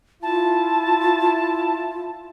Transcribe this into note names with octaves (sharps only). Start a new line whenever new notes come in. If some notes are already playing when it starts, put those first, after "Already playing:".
E4 F4 A5